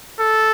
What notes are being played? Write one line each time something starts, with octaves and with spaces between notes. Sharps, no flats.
A4